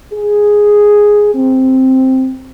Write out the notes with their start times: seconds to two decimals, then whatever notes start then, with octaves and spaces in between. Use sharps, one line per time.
0.13 G#4
1.35 C4